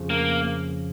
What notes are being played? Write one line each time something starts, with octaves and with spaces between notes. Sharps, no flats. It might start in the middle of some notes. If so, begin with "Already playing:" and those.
Already playing: F2 C#3 F3
A#3